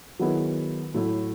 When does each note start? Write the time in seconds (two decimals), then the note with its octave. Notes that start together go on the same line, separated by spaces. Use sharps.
0.19 D#3 F#3 B3 E4 G#4
0.94 A2 F#3 A3 E4